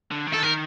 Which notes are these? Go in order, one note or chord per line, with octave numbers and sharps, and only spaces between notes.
D3
D#3
A4
D#3 A#4